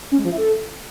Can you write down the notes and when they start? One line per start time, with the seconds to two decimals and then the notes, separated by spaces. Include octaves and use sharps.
0.11 C#4
0.18 G#3
0.24 F3
0.31 E4
0.37 A4